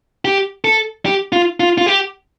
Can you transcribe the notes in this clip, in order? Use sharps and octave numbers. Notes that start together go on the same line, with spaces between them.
G4
A4
G4
F4
F4
F4
G4